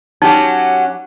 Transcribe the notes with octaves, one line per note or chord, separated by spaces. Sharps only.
F#3 C#4 D#4 G4